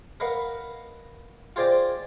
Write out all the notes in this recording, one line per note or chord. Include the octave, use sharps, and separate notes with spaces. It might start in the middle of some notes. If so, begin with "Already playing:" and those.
A#4 B4 D#5 F5 F#5
F4 G#4 C5 D5 D#5 G5